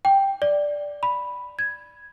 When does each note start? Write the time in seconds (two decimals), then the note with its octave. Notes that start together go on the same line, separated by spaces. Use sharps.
0.05 G5
0.42 D5
1.03 B5
1.59 G#6